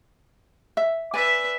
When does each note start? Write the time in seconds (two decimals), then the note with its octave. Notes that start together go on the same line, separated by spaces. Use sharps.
0.77 E5
1.14 B4 D5 E5 G#5